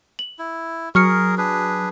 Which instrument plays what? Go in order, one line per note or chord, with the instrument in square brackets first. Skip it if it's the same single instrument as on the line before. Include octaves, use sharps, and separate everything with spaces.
[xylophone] F#7
[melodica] E4
[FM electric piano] F#3 [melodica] G#4 A#4 [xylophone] C#6 F6 C#7
[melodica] D4 G#4 B4